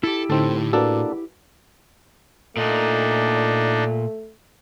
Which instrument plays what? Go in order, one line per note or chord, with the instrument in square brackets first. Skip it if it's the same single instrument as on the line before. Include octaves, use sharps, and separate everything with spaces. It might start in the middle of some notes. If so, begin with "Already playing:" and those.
[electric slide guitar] E4 G4 [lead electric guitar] A4
[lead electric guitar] A2 [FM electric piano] D3 D#4 [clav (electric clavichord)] C4 A4
[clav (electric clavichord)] A#3 D4 A4 [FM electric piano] F#4 B4
[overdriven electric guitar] A#2 [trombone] A3 [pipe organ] D4 D#4